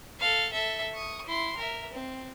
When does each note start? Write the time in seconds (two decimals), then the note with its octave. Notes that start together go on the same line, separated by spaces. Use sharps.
0.19 A4 F5
0.53 A4 E5
0.94 C#6 D#6
1.26 E4 C6
1.57 A#4 E5
1.93 C4